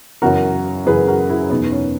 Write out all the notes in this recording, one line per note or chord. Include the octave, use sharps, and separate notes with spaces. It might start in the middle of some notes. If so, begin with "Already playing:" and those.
F#2 C#3 E3 F#4 A#4
F#2 C#3 E3 G#4 B4
F#4 A#4
E4 G#4
E2 B2 B3 D#4
C#4